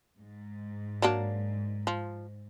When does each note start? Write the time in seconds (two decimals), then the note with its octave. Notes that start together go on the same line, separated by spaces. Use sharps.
0.18 G#2
1.02 F#3 A#3 D4
1.87 F3